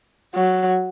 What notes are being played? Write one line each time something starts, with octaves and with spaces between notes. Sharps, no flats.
F#3